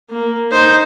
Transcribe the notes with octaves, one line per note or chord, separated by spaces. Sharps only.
A#3
D#4 C5